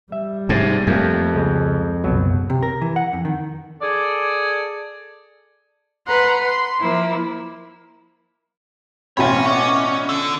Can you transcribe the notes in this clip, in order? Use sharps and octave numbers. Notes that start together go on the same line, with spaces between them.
G3 E5
G#2 C3 A5
F2 A3 A#3
C#2 G#3
F#1 C2 B2 F#3
C3
A#4
E3
F#5
F2
D#3
G#4 A4 D5
B4 F#5 A#5 C6
C6
F3 A#3 E4
A1 B2 C4 F4 C#5 G#5 B5
B3 C#4 D5 D#5
D3 A4